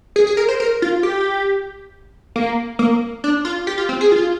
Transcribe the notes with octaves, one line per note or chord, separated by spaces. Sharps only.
G#4
G#4
A#4
C5
A#4
F4
G4
A#3
A#3
D4
F4
G4
F4
C4
G#4
F4